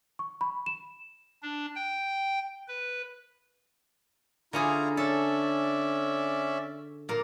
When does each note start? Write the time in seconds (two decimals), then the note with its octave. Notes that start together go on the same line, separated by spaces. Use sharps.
0.19 C#6
0.41 B5
0.66 E7
1.43 D4
1.76 G5
2.68 B4
4.53 D3 C#4 E4 F4 G#4 A#5
4.97 C#4 A4 D5 E5
7.09 A#2 A#4